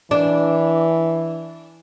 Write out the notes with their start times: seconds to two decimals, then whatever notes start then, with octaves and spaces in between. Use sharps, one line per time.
0.11 E3 D4